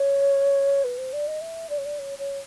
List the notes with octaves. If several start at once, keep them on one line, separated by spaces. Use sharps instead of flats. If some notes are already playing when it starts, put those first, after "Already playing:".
Already playing: C#5
B4
C5
D5
D#5
E5
D5
C#5
D5
C#5
C#5